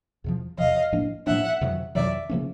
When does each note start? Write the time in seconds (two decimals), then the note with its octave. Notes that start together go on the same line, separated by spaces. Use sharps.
0.24 E2 C3 F3
0.58 E2 C3 F3 D#5 F5
0.92 A2 F3 A#3 D4
1.27 A2 F3 A#3 D4 E5 F#5
1.61 F2 C3 D#3 F#3
1.95 F2 C3 D#3 F#3 D5 E5
2.29 C#3 F3 A#3 C#4